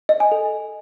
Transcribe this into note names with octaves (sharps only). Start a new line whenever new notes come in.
D#5
G#5
A4